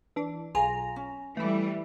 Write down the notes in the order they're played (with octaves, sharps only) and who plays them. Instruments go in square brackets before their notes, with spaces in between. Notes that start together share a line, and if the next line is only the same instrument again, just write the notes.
[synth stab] E3 D4
[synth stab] B1 F4 A#5 [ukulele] G#4
[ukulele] C#4
[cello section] E3 G3 [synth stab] A3 E4